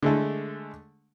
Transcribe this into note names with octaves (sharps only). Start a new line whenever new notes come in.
D3 G#3 A3